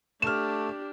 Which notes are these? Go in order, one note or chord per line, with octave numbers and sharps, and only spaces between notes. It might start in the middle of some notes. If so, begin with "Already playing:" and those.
A3 D4 G4 F6 E7